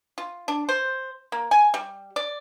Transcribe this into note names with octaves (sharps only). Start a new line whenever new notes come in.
F4
D4
C5
A#3
G#5
G3
D5